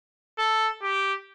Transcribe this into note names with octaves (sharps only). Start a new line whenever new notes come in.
A4
G4